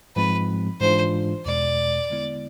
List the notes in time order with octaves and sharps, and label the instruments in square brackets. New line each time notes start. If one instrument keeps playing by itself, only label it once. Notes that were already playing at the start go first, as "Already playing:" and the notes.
[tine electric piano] G#2 F3 G#3 C4 [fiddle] B4
[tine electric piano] G#2 E3 G#3 D4 F4 [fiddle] C5
[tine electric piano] E2 B2 G#3 [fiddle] D5
[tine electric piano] D3 G#3 B3 E4